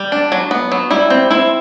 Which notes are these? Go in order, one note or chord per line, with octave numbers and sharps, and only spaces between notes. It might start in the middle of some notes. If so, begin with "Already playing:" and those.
Already playing: G3
D4
F#3
B3
F#3
G3 E4
C4
C4 E4